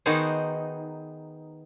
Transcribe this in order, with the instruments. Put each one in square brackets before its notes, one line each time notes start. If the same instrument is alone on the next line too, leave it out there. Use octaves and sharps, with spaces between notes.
[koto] D#3 B3 D#4 F#4 G#4 C5